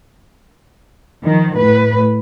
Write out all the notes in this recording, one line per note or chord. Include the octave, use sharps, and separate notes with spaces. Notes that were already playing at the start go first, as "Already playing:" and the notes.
D#3 F3
A2 B4